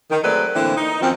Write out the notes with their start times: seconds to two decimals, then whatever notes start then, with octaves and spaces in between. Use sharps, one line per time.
0.11 D#3
0.23 F#3 G#3 A3 C4 B4 D5
0.55 A2 D3 E3 A#3 C4 E4
0.75 D#4
1.01 F#2 D#3 F3 C4